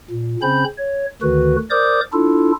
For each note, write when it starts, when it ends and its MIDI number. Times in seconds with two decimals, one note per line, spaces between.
0.10 0.36 46
0.42 0.64 49
0.42 0.64 60
0.42 0.64 61
0.42 0.64 72
0.42 0.64 83
0.42 0.64 91
0.78 1.06 73
1.22 1.56 38
1.22 1.56 50
1.22 1.56 51
1.22 1.56 66
1.22 1.56 71
1.70 2.01 70
1.70 2.01 72
1.70 2.01 74
1.70 2.01 86
1.70 2.01 87
1.70 2.01 91
2.13 2.52 62
2.13 2.52 64
2.13 2.52 65
2.13 2.52 69